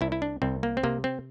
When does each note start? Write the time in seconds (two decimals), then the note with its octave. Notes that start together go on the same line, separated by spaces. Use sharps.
0.01 C2 E4
0.12 E4
0.22 D4
0.42 C2 C4
0.63 A#3
0.77 C4
0.83 C3 A#3
1.04 C4